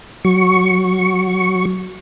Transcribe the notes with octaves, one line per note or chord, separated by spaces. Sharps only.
F#3 C#6